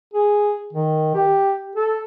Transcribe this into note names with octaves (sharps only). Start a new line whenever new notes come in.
G#4
D#3
G4
A4